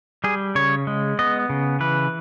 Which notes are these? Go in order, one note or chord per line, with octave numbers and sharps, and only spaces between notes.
G3 G#4
C#3 C#5
G#3
B3 D#5
C#3
E3 B4